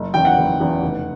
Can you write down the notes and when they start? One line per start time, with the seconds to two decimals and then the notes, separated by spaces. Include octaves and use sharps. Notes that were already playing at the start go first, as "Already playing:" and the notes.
Already playing: F#1
0.14 E2 C#3 E3 G5
0.25 F#5
0.37 F#1
0.60 E2 C#3 E3
0.82 F1